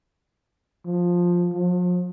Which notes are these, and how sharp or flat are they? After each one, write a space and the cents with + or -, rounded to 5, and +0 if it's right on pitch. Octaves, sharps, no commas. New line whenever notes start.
F3 +10
F3 +40